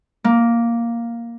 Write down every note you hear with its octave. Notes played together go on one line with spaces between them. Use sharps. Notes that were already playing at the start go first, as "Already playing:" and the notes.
A#3